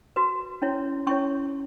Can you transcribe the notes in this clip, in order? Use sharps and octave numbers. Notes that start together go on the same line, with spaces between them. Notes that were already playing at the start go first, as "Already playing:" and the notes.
F#4 B4
C#4 E4 C#5
C#4 E4 C#5 C#6